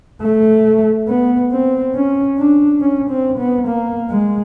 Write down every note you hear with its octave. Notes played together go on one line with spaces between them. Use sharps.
A3
B3
C4
C#4
D4
C#4
C4
B3
A#3
G#3